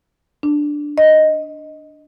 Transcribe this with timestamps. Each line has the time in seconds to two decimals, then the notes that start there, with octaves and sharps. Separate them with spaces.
0.43 D4
0.98 D#5